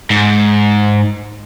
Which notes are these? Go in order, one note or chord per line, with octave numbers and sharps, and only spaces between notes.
G#2